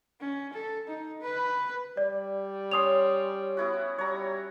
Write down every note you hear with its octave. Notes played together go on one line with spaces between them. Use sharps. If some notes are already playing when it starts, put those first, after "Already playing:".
C#4
A4
D#4
B4
G3 D5
C#4 C6 D#6 F7
B3 E4 F#4
G3 C#5 A#5